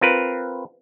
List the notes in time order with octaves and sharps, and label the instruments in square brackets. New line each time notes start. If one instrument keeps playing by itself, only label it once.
[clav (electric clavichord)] C4 F4 A#4 B4